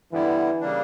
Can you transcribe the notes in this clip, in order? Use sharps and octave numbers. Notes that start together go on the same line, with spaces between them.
G2 D3 E3 G3 B3 E4
C#3 G3 A#3 D4